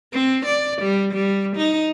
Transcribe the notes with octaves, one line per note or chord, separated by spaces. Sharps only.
C4
D5
G3
G3
D#4